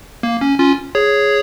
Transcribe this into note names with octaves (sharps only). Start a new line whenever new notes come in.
A#3
C#4
C#4 F4
G#4 C#5